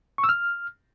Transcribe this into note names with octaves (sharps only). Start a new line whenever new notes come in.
C#6
E6
F6